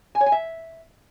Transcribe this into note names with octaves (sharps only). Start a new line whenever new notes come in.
G#5
C#5
G#5
E5